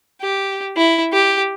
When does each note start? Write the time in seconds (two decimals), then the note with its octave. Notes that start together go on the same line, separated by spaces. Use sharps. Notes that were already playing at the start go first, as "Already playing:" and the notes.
0.22 G4
0.77 E4
1.13 G4